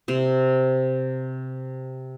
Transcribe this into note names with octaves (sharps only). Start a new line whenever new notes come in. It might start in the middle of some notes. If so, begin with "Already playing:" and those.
C3 C5